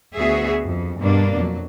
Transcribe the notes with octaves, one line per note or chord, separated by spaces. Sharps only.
D2 B3 F#4 G#4 E5
F2
G2 B2 G3 A#3 D4
F2 F#3